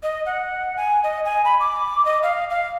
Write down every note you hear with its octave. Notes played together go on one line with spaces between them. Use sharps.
D#5
F#5
G#5
D#5
G#5
B5
D6
D#5
F5
F5